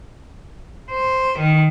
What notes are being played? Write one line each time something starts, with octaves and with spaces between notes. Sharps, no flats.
C5
D#3